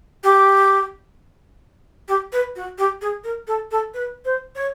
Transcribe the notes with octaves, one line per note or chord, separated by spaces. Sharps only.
G4
G4
B4
F#4
G4
G#4
A#4
A4
A4
B4
C5
C#5